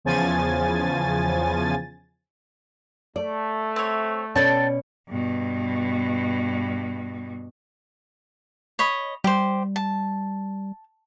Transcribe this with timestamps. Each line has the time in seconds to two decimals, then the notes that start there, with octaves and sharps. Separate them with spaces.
0.04 E2 C#3 F3 G#5 A6
3.16 A3 D5
3.76 C4 C#5
4.35 B2 C#4 A4 D5 G5 A5
5.09 G2 B2
8.79 C#5 D#5 B5
9.24 G3 G4 C5
9.76 A5